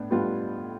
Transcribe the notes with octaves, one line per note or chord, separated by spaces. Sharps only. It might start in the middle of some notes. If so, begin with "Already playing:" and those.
Already playing: A2 B3 D4
A2 G3 B3 D4 F4